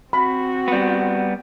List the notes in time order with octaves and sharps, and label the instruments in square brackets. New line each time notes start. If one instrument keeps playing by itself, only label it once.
[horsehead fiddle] C4 F#4 [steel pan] B5
[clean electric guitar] G3 B3